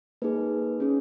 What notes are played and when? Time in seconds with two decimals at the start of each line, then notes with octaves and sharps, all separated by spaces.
0.22 A#3 D#4 G#4 B4
0.80 C#4 G#4